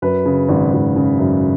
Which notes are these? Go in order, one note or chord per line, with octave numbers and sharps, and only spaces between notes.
F#2 B4
C#3
G#1
G#1
C#3
F#2